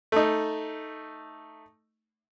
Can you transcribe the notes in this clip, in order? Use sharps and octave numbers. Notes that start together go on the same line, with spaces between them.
A3 D#4